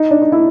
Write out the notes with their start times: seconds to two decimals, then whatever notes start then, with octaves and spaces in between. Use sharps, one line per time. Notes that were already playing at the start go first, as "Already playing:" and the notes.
Already playing: D#4
0.11 D4
0.22 D#4
0.32 E4